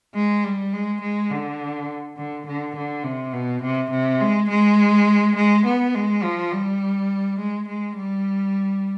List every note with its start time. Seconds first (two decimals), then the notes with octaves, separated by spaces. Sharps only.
0.15 G#3
0.44 G3
0.73 G#3
1.01 G#3
1.31 D3
2.17 D3
2.46 D3
2.76 D3
3.04 C3
3.33 B2
3.63 C3
3.91 C3
4.20 G#3
4.50 G#3
5.36 G#3
5.66 B3
5.95 G#3
6.23 F3
6.52 G3
7.39 G#3
7.68 G#3
7.97 G3